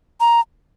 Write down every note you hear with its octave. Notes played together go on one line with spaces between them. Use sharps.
A#5